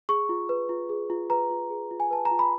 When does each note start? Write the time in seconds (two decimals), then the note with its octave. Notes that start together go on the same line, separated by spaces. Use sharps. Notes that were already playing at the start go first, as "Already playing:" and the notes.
0.09 G#4 C#6
0.29 F4
0.49 B4
0.69 F4
0.89 G#4
1.10 F4
1.30 B4 A#5
1.51 F4
1.70 G#4
1.91 F4
2.00 G#5
2.11 B4 A5
2.25 A#5
2.31 F4
2.39 B5